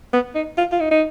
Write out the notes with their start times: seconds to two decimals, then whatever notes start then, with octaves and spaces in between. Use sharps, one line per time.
0.13 B3
0.35 D#4
0.58 F4
0.72 F4
0.80 D#4
0.91 D#4